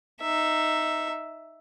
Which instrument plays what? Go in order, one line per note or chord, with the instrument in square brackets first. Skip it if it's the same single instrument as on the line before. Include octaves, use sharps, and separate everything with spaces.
[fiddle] D#4 E5